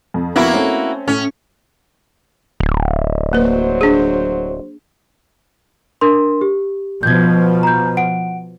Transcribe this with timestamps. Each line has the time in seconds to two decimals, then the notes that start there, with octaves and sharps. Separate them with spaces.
0.14 F2
0.36 F2 A#3 B3 E4 F#4
0.54 A3 C4 C#4
1.08 A2 C#4
2.60 D1
3.33 F#3 A#3 B4 C5
3.81 D4 G#4
6.01 D4 A#4 C6
6.41 G4
7.03 B2 F3 G6 G#6
7.63 A#5 G6
7.97 F#5 D7